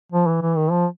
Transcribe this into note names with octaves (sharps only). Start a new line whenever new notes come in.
F3
E3
E3
D#3
F3